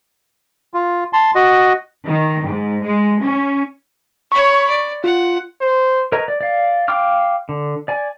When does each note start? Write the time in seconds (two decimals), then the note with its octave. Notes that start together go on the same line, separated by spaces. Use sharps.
0.74 F4
1.13 A5 C6
1.35 F#4 D#5
2.06 D#3
2.44 G#2
2.84 G#3
3.21 C#4
4.32 C#5 B5 C#6
4.69 D5
5.04 F4 F#5
5.61 C5
6.12 A#4 B4 C#5 D#5 A#5
6.28 D5
6.41 D5 F5
6.88 F5 G5 C6 D6 F6
7.49 D3
7.88 D5 G#5